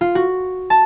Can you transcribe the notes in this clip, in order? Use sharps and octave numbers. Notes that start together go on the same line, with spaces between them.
F4
F#4
A5